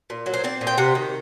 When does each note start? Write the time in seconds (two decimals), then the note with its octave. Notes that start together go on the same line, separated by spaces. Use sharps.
0.10 A#2
0.26 F#3
0.34 C5
0.44 C4 D5
0.61 A#2
0.67 G5
0.78 C3 F#5
0.95 D#3